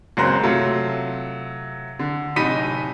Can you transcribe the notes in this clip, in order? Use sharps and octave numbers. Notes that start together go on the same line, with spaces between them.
F#1 C#2 F#3 C4 A#5 C6
C3 F#3 A3 F4
D3
D1 C3 D#4 B5 B6 D#7